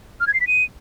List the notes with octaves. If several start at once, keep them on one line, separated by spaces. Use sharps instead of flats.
F6
G#6
C7
B6
D#7